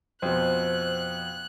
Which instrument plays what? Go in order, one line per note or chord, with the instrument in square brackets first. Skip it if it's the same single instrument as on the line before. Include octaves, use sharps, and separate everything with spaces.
[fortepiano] F2 B2 [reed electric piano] C5 [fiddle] F#6